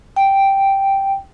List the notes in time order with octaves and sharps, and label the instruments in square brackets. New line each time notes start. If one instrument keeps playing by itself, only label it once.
[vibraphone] G5